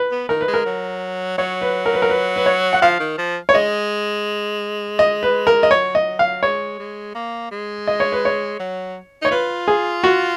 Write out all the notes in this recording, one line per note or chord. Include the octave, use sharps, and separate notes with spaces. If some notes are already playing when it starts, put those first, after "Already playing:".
Already playing: B4
B3
D#3 A#4
B4
G#3
A#4
F#3
F#3 C#5
B4
A#4
B4
A#4
B4
B4
C#5
F#5
F3 F5
D#3
F3
C#5
G#3 D#5
D#5
B4
A#4
D#5
F#3 C#5
D#5
F5
G#3 C#5
G#3
A#3
G#3
D#5
C#5
B4
C#5
F#3
D#4 C#5
F4 B4
G#4
F#4